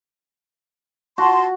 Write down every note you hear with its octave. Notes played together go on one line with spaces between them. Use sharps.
F#4 A5 C6